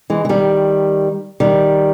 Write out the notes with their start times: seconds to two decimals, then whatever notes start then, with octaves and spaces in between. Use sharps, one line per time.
0.10 E3 G#3
0.25 E3
0.29 D#3 G3
1.40 D#3 G3